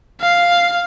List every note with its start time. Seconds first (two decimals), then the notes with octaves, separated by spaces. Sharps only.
0.21 F5